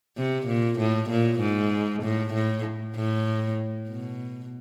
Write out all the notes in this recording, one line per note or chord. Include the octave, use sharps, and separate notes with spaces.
C3
A#2
A2
A#2
G#2
A2
A2
A2
B2